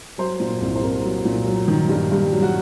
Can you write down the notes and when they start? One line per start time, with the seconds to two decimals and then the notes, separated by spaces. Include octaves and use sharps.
0.18 F#3 C5
0.40 A#2
0.61 C2
0.76 C5
0.82 C2 A#4
1.04 F#3
1.25 A#2
1.47 F#3
1.68 D#3
1.89 G2
2.10 G2 G4
2.32 F#3
2.42 F#4